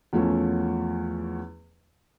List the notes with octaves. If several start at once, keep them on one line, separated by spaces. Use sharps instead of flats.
E2 F3 A3 C#4